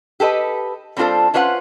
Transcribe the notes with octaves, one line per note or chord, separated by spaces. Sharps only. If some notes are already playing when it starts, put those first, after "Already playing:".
G4 A4 B4 D#5
G3 C4 D4 F4 A4 C5
C#4 D4 F4 B4 C5 F#5